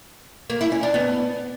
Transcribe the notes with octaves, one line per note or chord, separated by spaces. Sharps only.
A#3
E4
C#4
D4
B3